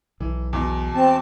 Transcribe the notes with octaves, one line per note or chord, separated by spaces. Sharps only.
B1 E3
E2 B2
C4 A5